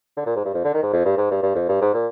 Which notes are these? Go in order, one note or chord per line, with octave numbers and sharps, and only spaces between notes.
D3
A#2
G#2
G2
F2
D3
D#3
G#2
F2
G2
G#2
G2
G2
F2
G2
G#2
A#2